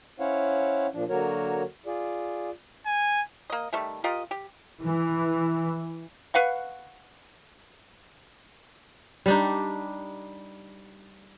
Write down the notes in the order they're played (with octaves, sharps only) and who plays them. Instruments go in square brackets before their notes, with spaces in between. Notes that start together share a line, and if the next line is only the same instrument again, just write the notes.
[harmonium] C#4 E4 C5 C#5 F5 F#5
A#2 F3 D4
D3 F#3 A#3 F#4 A#4 C#5
F4 G#4 D5
[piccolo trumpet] G#5
[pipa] A#3 D#5
D#3 G3 A3
F4 G4 A#4 D#5
G4
[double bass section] E3
[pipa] B4 F5 F#5 C#6
[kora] G3 D4 D#4